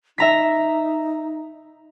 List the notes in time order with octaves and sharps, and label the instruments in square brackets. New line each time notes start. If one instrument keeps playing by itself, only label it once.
[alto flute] D#4 [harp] E5 A#5 B6